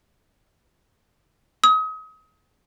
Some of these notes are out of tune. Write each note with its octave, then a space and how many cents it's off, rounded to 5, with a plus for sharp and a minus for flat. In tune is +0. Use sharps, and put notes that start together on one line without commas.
D#6 +35